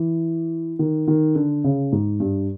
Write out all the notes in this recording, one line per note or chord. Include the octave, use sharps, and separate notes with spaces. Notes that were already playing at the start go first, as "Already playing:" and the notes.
Already playing: E3
D#3
D#3
D3
C#3
G#2
G2